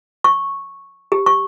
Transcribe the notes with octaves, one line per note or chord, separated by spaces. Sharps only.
C#6
G4
C#6